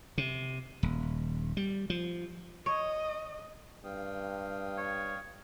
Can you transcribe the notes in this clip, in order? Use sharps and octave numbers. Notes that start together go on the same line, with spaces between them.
C3
D#1
G3
F3
C#5 D#5
G2 F5 G5 D#6
C#5